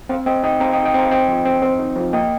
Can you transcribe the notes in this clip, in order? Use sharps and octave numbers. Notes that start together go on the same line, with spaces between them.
C4 C5 F5
C4 D#5 G5
D#4 D#5 G5
C4 F5 A#5
D#5 G5
D#4
D#5 G5
C4 F5 A#5
C4 D#5 G5
F3
C4
C4
D#4
F3
A#3 D#5 G5